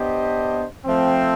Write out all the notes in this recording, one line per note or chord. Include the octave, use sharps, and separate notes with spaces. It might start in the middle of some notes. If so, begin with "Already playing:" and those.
Already playing: B3 D4 G4 C5 D#5
F3 A3 C4